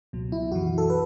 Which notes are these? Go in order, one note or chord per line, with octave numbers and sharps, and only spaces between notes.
C#2 B2 F#3
E4
F#2 E3 F#4
A4
B4